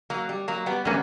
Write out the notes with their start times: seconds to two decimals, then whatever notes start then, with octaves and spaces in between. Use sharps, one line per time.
0.10 F#3 A#3
0.29 G3
0.48 F#3 A#3
0.66 G3 B3
0.85 D3 G3 A#3 B3 C#4